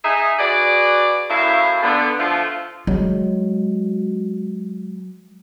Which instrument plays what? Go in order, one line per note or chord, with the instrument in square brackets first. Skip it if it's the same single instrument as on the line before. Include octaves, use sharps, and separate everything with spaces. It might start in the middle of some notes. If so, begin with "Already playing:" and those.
[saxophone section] D#4 G#4 E5
F#4 G#4 B4 D5
F#2 A2 E4 A#4 E5 F5
D3 B3
D3 F3 A3 F4
[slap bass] F#3 [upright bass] G#3